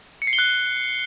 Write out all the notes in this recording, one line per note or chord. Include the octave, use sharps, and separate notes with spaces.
C#7
C7
G7
F#6